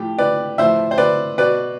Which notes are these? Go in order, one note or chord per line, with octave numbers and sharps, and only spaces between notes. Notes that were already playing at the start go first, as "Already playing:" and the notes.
Already playing: A2 F3 G4
B4 D5
A2 F3 C5 E5
C5
B4 D5
B2 B4 D5